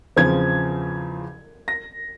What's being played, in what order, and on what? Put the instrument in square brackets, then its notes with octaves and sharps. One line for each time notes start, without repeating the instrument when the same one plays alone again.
[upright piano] E2 C#3 F3 C4 [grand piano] G#6
[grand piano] A#6